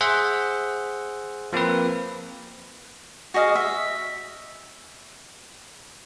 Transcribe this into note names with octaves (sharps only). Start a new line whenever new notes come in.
G#4 C5 E5 F#5
F3 A#3 C4 F4 B4
F#4 G#4 D#5 F5
E5